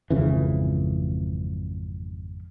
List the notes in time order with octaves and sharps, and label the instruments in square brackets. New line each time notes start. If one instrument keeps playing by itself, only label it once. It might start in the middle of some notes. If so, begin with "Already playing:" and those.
[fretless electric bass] G#1 F2 C#3 E3